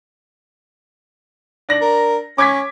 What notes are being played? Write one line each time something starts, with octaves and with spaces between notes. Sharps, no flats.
D4 A#6 F#7
A#4
C#4 D6 G#6 B6